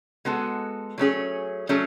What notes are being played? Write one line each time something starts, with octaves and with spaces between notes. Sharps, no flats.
G#3 B3 F#4 A4
F#3 A3 C#4 G#4
F#3 A3 C#4 G#4